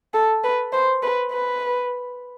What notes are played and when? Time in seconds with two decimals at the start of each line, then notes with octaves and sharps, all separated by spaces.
0.14 A4
0.43 B4
0.72 C5
1.03 B4
1.32 B4